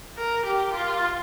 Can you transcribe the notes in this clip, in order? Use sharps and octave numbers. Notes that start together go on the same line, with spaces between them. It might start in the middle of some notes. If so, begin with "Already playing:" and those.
A#4
G4
F4